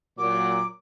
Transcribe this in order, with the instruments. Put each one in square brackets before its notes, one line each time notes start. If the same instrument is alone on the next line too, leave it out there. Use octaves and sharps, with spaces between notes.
[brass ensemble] A#2 F#3 [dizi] D6